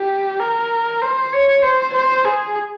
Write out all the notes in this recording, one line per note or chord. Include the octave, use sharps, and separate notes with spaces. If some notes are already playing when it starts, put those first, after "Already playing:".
Already playing: G4
A#4
C5
C#5
C5
C5
G#4